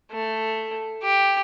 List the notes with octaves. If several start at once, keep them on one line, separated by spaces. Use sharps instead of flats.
A3
G4